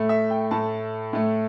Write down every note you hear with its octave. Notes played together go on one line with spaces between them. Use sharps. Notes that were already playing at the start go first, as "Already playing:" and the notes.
Already playing: A2 A3
E5
G5
A2 A3 A5
A2 A3